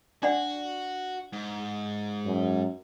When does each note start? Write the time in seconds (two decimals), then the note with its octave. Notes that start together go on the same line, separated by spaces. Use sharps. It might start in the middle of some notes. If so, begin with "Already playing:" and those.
0.23 D4 F#4 D5 F#5
1.33 G#2
2.26 F#2